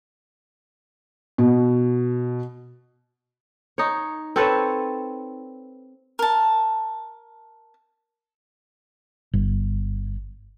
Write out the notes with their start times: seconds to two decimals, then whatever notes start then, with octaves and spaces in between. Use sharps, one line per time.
1.38 B2
3.78 D#4 C#5
4.36 C4 A4 B4 C#5
6.19 A#4 A5
9.33 G1